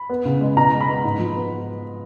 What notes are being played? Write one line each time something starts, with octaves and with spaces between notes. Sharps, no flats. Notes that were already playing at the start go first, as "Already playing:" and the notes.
Already playing: B5
B3
C#3
G#3
B2 A#5
G#3
B5
B3
G#2
F3
B3